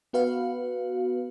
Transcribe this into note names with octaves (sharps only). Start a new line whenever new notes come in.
B3 F#4 B4 F5